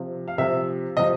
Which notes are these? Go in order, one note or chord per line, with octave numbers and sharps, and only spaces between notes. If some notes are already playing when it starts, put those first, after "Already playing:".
Already playing: C3 F3
F5
C3 F3 E5
C3 F3 D#5